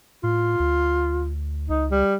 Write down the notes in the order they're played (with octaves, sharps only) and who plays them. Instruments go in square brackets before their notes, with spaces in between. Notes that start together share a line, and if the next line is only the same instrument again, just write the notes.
[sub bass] A2 [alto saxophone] F4
[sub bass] D2
[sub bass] C#2 [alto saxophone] D#4
[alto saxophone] G3